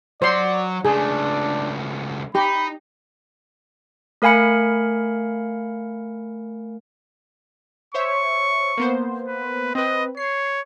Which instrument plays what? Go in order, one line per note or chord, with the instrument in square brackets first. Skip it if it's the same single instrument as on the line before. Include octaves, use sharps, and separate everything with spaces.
[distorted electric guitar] F#3 [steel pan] C5 C6 [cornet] D5
[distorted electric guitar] C#2 A3 [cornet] D4 [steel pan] G#4
[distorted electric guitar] D#4 [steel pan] G4 [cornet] B5
[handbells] A3 A#4 F5 G#5 B5 C#7
[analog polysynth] C5 C#5 E5 [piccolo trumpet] C#6
[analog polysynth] A#3 B3 C5
[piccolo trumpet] B4
[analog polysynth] C4 B4 [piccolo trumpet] D#5
[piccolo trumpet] C#5 [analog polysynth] C7